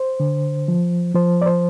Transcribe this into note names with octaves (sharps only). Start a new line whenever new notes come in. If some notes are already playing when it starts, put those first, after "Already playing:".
Already playing: C5
D3
F3
F3 C5
D5
C5